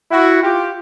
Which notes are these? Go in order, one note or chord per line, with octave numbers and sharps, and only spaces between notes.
E4 F#4
F4 G4